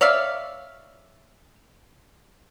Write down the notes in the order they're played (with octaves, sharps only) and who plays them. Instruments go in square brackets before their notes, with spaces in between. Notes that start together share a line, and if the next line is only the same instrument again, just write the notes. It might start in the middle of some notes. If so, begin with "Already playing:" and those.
[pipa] C#5 D5 E5 F5